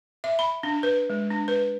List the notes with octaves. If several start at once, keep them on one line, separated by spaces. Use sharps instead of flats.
E5
B5
D4
B4
G#3
D4
B4